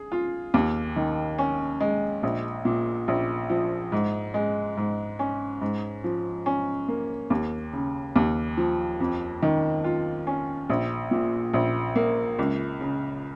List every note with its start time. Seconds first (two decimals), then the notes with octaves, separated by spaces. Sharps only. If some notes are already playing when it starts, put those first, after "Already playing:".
Already playing: G#4
0.12 F4
0.54 D#2
0.96 D#3
1.39 C#4
1.81 G#3
2.23 A#1
2.65 A#2
3.08 A#1
3.50 F3
3.92 G#2
4.34 G#3
4.77 G#2
5.19 C#4
5.62 G#2
6.04 F3
6.46 C#4
6.88 A#3
7.30 D#2
7.73 C#3
8.16 D#2
8.57 F3
9.00 F2
9.43 D#3
9.84 F4
10.27 C#4
10.70 A#1
11.11 A#2
11.54 A#1
11.96 A#3
12.39 C#2
12.81 C#3